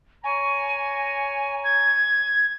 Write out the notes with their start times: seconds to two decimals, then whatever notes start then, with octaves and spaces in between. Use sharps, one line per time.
0.24 C#5 G#5 A#5 C#6
1.64 G#6